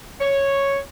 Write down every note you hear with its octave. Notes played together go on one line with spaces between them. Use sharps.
C#5